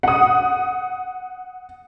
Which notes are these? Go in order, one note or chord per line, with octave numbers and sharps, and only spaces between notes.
F#5 D#6